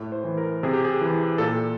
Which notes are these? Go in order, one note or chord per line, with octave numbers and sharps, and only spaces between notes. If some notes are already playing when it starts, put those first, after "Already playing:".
Already playing: A2
C5
E3
A#4
C3 G#4
G4
G#4
E3
A#2 A4